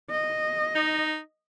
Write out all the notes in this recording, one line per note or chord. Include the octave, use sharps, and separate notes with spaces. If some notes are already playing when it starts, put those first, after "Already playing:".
D#5
D#4